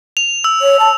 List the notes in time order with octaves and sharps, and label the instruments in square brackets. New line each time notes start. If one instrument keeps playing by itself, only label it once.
[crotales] F7
E6
[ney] C#5
A5